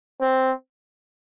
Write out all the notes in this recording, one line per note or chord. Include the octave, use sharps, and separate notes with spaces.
C4